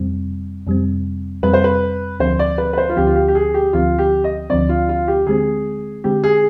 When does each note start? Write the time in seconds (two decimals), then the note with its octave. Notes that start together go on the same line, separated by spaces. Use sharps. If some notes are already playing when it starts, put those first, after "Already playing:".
Already playing: F2 C3 G3 C4
0.67 F2 C3 G3 C4
1.43 F2 C3 G3 C4 B4
1.54 C5
1.64 B4
2.20 D2 D3 F3 C4 C5
2.39 D5
2.58 B4
2.73 B4
2.78 C5
2.89 F4
2.96 D2 D3 F3 C4 G4
3.07 F4
3.16 G4
3.28 G4
3.35 G#4
3.54 G4
3.73 D2 D3 F3 C4 F4
3.99 G4
4.24 D#5
4.50 D2 D3 F3 C4 D5
4.69 F4
4.89 F4
5.08 G4
5.27 D3 G#3 C4 G#4
6.04 D3 G#3 C4 G4
6.24 G#4